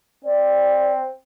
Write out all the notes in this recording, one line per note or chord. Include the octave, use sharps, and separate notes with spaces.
C4 D5